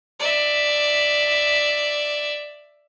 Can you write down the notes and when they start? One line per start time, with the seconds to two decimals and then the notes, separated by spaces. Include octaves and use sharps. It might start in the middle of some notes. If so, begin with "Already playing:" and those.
0.20 D5 E5